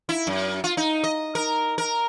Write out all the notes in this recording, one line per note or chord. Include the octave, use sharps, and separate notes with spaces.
E4
F#2
F4
D#4
D#5
A#4
A#4